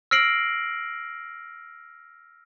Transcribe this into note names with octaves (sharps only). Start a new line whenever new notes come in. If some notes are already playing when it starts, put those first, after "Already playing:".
E6 F6 A#6 C7 D7 F#7